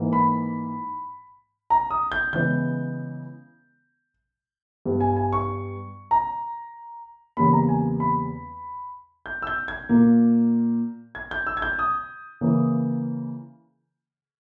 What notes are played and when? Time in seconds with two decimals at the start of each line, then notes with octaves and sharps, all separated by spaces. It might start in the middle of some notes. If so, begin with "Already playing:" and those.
Already playing: G#2 E3 A#3
0.13 B5
1.70 A#5
1.90 D#6
2.12 G6
2.33 C#3 E3 G#3 B3 G6
4.85 G2 G3 B3
5.00 G#5
5.16 G#5
5.33 C#6
6.11 A#5
7.37 E2 C#3 G3 A#3 B5
7.53 A#5
7.69 G#5
8.00 B5
9.26 G6
9.42 E6
9.47 G6
9.68 G#6
9.89 A#2 A#3
11.15 G#6
11.31 G6
11.47 E6
11.57 G#6
11.62 G6
11.79 D#6
12.41 C#3 E3 A#3